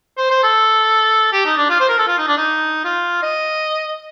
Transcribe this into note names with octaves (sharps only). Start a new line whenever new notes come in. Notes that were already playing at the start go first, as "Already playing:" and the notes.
C5
C5
A4
G4
D#4
D4
F4
C5
A#4
A4
F4
D#4
D4
D#4
F4
D#5